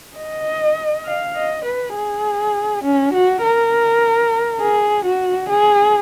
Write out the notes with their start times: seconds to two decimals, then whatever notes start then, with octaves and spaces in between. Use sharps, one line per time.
0.17 D#5
1.05 F5
1.36 D#5
1.65 B4
1.95 G#4
2.84 C#4
3.14 F#4
3.43 A#4
4.61 G#4
5.06 F#4
5.50 G#4